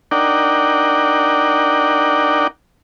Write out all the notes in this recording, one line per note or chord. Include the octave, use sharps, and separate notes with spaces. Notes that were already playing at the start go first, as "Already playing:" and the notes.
D4 D#4 A#4 D5 F#5 G5